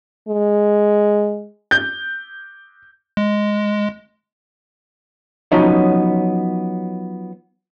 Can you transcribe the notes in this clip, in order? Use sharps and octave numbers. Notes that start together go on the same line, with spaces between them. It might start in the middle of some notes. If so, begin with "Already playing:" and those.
G#3
G6
G#3
F3 F#3 B3 C#4 D#4